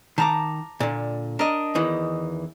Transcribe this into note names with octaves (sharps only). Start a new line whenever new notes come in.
D#3 A5 A#5 D6
A#2 D3
D4 A#4 D#5
E2 D#3 E3